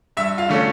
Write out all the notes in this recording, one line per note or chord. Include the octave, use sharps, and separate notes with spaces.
G2 E5
F4 F5
D3 A3 C#4